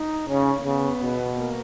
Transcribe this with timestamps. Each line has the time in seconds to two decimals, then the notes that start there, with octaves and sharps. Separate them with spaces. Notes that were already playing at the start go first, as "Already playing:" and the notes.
Already playing: D#4
0.29 C#3 C#4
0.60 A#3
0.64 C#3 B3
1.02 B2
1.38 A#3